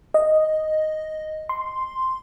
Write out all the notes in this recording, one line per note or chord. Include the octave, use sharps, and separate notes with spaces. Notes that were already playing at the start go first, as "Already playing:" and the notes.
D#5
C6